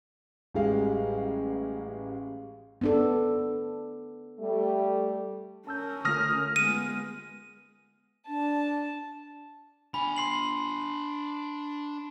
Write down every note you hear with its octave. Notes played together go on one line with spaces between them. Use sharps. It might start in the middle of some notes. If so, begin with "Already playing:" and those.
A1 G3 G#3 F5
B3 D4 A4
G3 A3
C#4 A#4 A5 E6 G6
D3 A3 F4 D#6 F6 A#6
G#3 B3 D#7
D4 A5
D4 G#5 B5
C6 C7 F#7